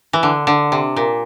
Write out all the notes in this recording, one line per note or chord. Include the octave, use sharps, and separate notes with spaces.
E3
D3
D3
C3
A#2